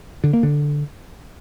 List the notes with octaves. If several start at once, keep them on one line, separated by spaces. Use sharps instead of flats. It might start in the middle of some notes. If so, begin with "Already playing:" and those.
D3
A#3
D3